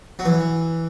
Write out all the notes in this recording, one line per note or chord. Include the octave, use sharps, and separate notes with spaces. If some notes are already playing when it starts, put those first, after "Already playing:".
F#3
E3